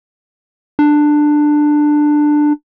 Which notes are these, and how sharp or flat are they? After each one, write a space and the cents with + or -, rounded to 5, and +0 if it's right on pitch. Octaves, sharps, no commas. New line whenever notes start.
D4 +15